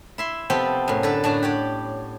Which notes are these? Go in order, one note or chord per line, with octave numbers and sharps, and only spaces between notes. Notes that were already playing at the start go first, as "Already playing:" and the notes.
E4 E5 C6
C3 F3 B3 C4 G4 A4
F#2 A2
D3 A4 B4
A2 D4 F#4 A5
G4 C#5 D5